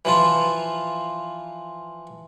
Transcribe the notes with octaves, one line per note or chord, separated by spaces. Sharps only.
E3 F3 F4